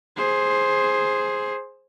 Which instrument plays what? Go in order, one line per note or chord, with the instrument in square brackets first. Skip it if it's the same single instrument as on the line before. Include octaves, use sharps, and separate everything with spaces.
[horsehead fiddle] G#4 C5